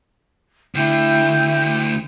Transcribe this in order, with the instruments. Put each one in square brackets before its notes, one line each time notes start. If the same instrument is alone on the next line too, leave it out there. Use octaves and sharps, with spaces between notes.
[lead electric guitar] D2 D3 [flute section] E4 G5 G6